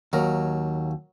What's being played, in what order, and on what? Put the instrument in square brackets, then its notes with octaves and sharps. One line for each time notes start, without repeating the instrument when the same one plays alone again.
[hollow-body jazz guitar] D#2 [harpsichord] F#3 A#4